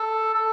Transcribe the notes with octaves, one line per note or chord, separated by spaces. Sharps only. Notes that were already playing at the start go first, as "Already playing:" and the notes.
Already playing: A4
A4